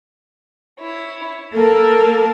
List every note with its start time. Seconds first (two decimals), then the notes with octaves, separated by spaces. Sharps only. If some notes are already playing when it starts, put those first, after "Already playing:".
0.80 E4 C#5
1.53 A#3 A4 A#4 A5